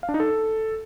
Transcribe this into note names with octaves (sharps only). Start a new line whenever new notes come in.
F5
D4
D#4
A4